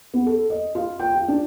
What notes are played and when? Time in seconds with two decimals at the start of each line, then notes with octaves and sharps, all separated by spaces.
0.14 B3
0.26 A4
0.50 D#5
0.75 F4
0.99 G5
1.16 F4
1.28 D4